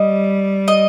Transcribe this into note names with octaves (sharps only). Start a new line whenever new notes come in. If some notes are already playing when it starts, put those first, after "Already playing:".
Already playing: G3 D#5
D#5